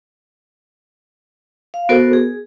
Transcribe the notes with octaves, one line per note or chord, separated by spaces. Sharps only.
F5
B3 F#4 A4 A#4 C5
G#4